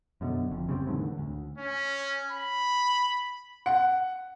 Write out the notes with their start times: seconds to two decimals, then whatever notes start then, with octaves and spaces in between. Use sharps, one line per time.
0.21 F#2 B2 D3
0.49 F#1 F2
0.67 F#1 C#3 G3 C4
0.87 E2 A2 D3 D#3
1.18 D2
1.58 C#4
2.31 B5
3.66 F#5